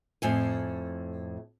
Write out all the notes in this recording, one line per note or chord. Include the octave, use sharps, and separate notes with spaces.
F2 A2 G#5